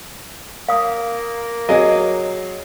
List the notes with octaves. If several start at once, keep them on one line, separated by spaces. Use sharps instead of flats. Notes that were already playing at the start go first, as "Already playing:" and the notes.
A#3 F5 D#6
F#3 G#4 D#5